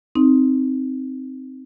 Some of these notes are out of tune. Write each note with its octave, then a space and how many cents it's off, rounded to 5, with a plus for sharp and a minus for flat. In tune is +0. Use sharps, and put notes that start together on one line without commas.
C4 +0 D#4 +0